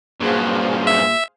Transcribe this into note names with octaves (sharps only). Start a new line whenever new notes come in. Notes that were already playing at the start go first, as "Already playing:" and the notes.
G2 A#2 F#3 G#4 C5 F5
E5